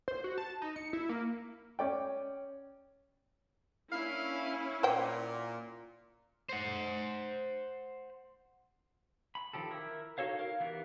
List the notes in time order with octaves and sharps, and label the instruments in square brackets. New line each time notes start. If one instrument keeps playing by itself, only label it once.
[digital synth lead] C5
F#4
A5
D#4
C#7
E4
A#3
[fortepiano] C#4 D5 G5
[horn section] A#3 D4 F5 [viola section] C#4 E4
[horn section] A#2 [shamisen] C5 G5
[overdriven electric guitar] C5 F#5
[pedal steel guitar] B5
D#3 F3 G4 A4
E4 A#4 E6
D#4 F#4 A4 C#5 F5
A#4 F5
E3 B3 D#4 G4 A#4